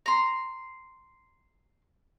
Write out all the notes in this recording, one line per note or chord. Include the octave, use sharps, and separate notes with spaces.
A#5 C6